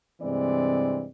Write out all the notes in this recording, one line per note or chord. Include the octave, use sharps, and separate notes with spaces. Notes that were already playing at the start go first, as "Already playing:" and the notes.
G2 C3 E3 G#3 C4 D5